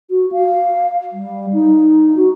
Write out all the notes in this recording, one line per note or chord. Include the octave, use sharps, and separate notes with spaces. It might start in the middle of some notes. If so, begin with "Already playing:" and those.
F#4
F5
G3
D#4
F#4